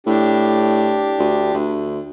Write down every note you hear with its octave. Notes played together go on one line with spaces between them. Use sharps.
A2 D4 G4
D2
D2